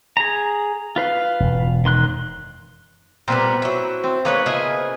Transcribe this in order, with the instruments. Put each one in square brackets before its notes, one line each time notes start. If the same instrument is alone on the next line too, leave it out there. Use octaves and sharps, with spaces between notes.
[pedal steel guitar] G#4 A#5
F4 B4 F5
[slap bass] E1 F#2
[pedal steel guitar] D#3 C6 F#6
[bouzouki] A#2 G3 B3 [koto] C4 B4
[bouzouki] F#3 E4
[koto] C4
[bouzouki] G#3 D#4 C#5 [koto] A#3 B3 B4
[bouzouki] C#3 F3 D#5 [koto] G#4 E5 G#5